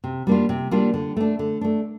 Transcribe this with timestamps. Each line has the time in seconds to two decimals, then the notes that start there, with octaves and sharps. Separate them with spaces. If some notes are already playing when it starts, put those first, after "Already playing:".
0.04 C3
0.27 G3 A#3 D4 F4
0.49 C3
0.71 G3 A#3 D4 F4
0.94 D3
1.17 A3 D4
1.39 D3
1.61 A3 D4